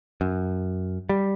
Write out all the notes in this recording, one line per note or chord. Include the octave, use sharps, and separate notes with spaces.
F#2
G3